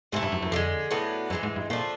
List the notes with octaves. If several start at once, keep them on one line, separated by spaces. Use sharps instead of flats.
G#2 C3 E3 A3
G2
F#2
F#2
F2 D3 F3 G#3
A2 F#3 B3 D4
F#2 E3 G#3 C4
G#2
G2
A#2 F3 A3 D4